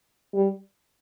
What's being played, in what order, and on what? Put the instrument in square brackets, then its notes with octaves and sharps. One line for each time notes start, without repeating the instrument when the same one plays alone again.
[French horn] G3